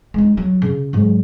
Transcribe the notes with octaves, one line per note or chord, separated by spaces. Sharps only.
G#3 D#4
F#3
C#3
G#2 F#3